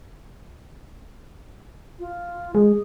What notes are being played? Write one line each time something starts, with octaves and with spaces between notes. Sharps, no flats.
F4
G#3 G#4